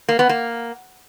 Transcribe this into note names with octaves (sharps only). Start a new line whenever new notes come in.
A#3
B3
A#3